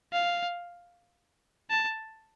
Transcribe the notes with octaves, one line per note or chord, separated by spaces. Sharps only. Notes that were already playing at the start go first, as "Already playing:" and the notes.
F5
A5